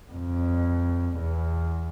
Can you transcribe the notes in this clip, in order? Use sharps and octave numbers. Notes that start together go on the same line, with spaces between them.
F2
E2